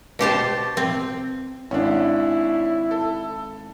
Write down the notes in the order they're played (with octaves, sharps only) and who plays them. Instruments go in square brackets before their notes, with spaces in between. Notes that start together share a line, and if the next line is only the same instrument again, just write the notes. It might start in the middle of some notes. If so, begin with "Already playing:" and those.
[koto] B2 G4 C5 A5
C4
[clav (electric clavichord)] G#1 [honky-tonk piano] C#4 D4 [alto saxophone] E4
[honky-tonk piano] A4